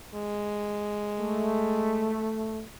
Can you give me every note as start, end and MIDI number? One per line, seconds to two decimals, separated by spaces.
0.15 2.27 56
1.19 2.62 57